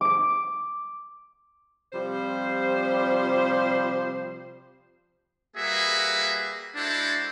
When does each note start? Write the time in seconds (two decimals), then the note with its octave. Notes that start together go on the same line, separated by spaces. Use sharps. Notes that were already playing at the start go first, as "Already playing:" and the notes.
0.01 D6 D7
1.93 C3 F3 G3 C5
5.57 G3 A#3 F#4 G#4 B4 E5
6.76 G#3 D4 E4 F#4 A4 C5